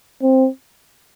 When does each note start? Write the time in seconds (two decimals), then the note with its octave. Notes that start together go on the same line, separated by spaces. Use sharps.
0.22 C4